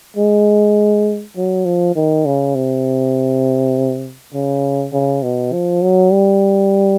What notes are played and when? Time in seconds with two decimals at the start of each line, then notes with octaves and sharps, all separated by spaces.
0.17 G#3
1.37 F#3
1.65 F3
1.96 D#3
2.26 C#3
2.55 C3
4.34 C#3
4.93 C#3
5.23 B2
5.53 F3
5.82 F#3
6.12 G3